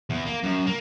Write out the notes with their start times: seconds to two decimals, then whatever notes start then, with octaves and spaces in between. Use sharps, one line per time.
0.10 E2
0.26 A#3
0.43 F#2
0.67 A#3